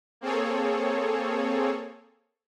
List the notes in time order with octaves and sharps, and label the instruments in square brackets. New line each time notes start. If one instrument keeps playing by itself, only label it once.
[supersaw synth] A#3 C4 G#4 A4 C#5